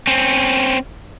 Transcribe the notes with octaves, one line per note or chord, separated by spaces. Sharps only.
C4 C#4